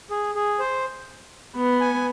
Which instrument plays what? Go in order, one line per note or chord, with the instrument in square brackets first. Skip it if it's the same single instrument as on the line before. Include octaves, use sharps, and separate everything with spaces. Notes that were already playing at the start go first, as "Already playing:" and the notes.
[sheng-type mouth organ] G#4
G#4
C5
[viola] B3
[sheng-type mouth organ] G#5